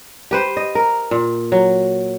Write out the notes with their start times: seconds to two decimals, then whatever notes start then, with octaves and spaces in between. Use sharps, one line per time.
0.31 G4 B4 C5
0.57 D#5
0.75 A#4
1.11 A#2
1.52 F#3